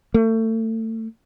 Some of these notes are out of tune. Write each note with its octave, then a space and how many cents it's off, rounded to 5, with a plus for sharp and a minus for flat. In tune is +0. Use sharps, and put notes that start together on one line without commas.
A3 +30